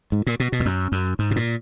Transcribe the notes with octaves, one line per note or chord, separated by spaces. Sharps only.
G#2
A#2
B2
B2
E2
F#2
F#2
G#2
B2
A#2